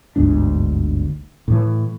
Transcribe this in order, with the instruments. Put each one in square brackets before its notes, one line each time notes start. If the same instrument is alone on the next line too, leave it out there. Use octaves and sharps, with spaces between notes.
[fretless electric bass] G1 D2 G#2 D4
A2 E3